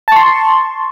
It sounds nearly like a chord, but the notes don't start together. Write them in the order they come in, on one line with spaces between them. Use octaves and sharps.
A5 C#6 C6